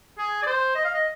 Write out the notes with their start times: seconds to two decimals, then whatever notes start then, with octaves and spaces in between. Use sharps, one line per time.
0.18 G#4
0.43 D5
0.47 C5
0.75 D#5
0.85 F5
0.94 D#5